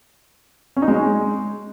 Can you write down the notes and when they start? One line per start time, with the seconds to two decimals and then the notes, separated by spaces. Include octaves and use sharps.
0.76 C#4
0.82 D#4
0.88 G#3